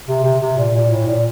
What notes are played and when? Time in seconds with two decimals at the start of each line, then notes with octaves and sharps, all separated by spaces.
0.08 C3
0.24 C3
0.41 C3
0.57 A#2
0.74 A#2
0.91 A2
1.07 A#2